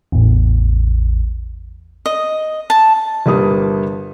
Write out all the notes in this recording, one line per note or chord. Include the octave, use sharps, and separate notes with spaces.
A1 E2
D#5
A5
G1 G3 A#3 D#6